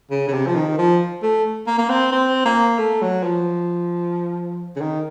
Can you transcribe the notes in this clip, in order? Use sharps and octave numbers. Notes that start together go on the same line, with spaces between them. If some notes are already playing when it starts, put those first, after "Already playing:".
C#3
C#3
C3
F3
D#3
F3
A3
A#3
A#3
C4
C4
A#3
A3
F#3
F3
C#3
D#3